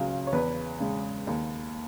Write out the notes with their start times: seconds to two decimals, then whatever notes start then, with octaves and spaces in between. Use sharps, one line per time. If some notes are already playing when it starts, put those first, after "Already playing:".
Already playing: C#2 C#3 F#3
0.27 C#5
0.32 E2 B4
0.80 C#3 G#3
1.27 D#2